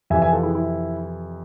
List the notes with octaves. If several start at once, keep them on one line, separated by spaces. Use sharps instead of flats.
F2 C3 E3 E5 G#5
E5 G#5
F4 A4
E4 G#4
E4